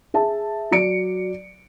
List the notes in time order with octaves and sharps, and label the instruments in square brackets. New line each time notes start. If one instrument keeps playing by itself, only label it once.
[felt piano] G#4 E5 A5
F#3 D5 C#7 D7